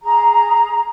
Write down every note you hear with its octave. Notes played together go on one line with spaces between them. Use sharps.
G#4 A#5